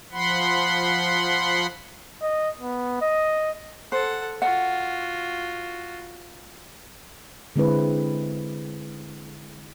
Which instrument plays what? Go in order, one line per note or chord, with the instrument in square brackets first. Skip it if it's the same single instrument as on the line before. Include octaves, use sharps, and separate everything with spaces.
[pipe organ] F3 F#5 B5 C6
[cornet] D#5
B3
D#5
[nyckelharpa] A4 F#5 [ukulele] C5
[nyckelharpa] F4 F#4 [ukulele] F#5
[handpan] D3 G#3 C4 E4 B4